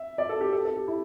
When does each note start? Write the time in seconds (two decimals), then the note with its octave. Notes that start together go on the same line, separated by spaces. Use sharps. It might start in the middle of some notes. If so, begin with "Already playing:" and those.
Already playing: E5
0.18 D5
0.29 A4
0.41 G4
0.53 A4
0.65 A4
0.76 G4
0.88 E4